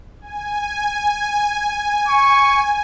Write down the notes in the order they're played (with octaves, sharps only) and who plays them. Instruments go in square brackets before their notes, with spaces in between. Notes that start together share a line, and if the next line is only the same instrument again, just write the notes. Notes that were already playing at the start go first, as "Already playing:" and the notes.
[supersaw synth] G#5
[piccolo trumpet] C#6